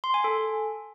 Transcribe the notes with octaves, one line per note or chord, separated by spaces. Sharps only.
C6
G#5
A4